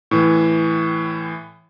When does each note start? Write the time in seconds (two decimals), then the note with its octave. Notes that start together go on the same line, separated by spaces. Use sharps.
0.11 A2 E3